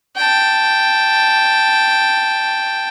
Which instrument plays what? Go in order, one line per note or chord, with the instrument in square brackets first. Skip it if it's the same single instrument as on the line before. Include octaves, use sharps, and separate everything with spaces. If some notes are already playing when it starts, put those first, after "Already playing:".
[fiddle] G5 A5